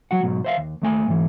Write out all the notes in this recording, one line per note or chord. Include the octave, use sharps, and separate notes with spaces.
F#3 F#4 F#5
G#2 B2 F#3
C5 E5 F5
D#2
D#2 A3 G#5
G#2 E3